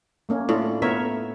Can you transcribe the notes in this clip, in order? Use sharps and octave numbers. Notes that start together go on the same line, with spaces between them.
A3 A#3 C#4
A2 D4 F4
B3 A#4 C#5 E5